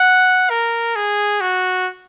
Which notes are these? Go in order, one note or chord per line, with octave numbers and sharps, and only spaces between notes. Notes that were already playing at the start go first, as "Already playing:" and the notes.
Already playing: F#5
A#4
G#4
F#4